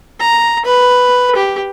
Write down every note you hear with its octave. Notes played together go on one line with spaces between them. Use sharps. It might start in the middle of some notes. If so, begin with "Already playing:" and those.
A#5
B4
G4